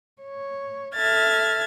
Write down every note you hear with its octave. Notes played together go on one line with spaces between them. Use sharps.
C#5
A4 E5 F6 G#6 A6